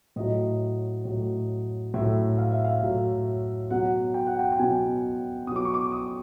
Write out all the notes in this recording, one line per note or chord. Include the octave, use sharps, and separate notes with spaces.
A2 F#3 D#5
A2 F#3
A2 F#3 E5
F5
E5
F5
A2 F#3
B2 F#3 F#5
G5
F#5
G5
G5
B2 F#3 G#5
B2 F#3 D6 D#6
C#6
D6
D#6